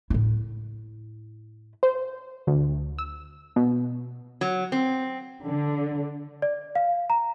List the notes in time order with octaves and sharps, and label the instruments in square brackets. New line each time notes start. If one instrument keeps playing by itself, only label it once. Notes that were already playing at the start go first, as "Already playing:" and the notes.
[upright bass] A2 E4
[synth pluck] C5
D2
E6
B2
[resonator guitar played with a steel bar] F#3
C4
[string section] D3
[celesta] D5
F5
A#5